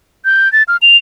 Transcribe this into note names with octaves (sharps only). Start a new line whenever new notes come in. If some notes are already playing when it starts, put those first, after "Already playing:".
G6
A6
F6
F7